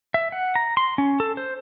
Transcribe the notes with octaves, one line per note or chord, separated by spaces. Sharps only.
E5
F#5
A#5
C6
C#4
A4
C5